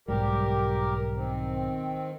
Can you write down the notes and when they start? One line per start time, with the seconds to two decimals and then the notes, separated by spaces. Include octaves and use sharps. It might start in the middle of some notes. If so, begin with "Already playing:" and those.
0.08 B1 G#2 G3 G4 A#4
1.15 D#3 C4